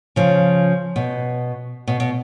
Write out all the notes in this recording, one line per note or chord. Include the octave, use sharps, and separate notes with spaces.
C#3 F3
B2
B2
B2